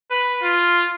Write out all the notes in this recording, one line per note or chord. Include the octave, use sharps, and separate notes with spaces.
B4
F4